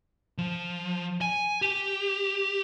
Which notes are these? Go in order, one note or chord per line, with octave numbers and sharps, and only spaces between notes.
F3
G#5
G4